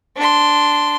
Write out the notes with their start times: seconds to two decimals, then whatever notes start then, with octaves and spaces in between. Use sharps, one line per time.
0.16 D4 C6